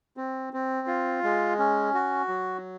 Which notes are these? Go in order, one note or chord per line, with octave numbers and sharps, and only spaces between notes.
C4
C4
F4
G#3
C#4
F#4
F#3